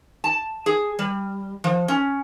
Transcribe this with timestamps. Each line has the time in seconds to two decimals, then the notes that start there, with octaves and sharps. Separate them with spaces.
0.24 A5
0.66 G#4
0.99 G3
1.64 F3
1.88 C#4